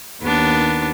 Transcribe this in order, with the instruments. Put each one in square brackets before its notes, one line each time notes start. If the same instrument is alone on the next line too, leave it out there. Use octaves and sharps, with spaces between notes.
[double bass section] D#2 [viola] B3 D4